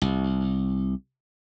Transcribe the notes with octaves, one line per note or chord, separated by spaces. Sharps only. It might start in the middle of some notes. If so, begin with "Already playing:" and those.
C2